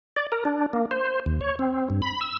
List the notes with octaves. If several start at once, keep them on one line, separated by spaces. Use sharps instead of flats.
D5
A#4
D4
A#3
C5
D#2
C#5
C4
G2
B5
E6